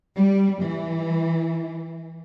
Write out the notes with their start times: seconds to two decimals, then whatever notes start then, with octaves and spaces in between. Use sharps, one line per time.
0.15 G3
0.62 E3